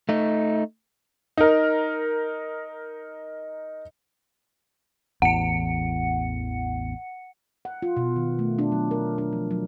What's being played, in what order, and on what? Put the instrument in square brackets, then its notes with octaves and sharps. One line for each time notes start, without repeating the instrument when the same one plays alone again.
[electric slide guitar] A3 D#4
[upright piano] D#4 A#4
[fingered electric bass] A1 E2 [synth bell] F#5 C#7
[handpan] F#5
F4
B2
D#3
A3
D4
F#3
A#4
D4
F3
F#3